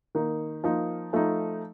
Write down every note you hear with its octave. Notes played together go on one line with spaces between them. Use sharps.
D#3 A#3 D#4
F3 A#3 D#4
F3 A3 D#4